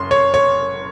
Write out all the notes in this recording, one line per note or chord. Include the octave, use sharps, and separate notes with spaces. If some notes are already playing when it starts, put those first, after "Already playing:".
Already playing: F#1 F#2 C6
C#5
C#5